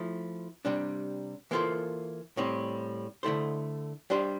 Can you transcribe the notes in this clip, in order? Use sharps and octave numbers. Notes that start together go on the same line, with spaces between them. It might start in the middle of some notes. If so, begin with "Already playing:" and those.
Already playing: F3 A3 E4
C3 G3 D4
E3 A#3 F4 A4 C5
A2 G3 C4
D3 A3 E4 A4 C5
G3 D4 G4 C5